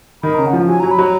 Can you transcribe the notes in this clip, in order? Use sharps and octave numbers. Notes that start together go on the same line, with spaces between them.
D#3 B5
C#3 A#5
F#5
F3
F#3 G#5
F#3 A#5
B5
F#3 A#5